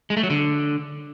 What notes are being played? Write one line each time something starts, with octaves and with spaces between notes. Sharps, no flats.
G#3
A3
F#3
D3